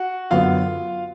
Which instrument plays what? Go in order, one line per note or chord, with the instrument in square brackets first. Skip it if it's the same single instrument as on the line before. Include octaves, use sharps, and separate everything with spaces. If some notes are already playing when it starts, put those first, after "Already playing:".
Already playing: [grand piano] F#4 F#5
[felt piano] F#2 D3 F#3 B3 [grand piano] F4 F5